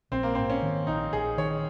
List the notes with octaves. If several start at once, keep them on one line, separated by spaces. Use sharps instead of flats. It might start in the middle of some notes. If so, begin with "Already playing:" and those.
A#1 C4
A#3
G#2 C4
C#4
D#3
A#1 D#4
A#1 G#4
D#3 C#5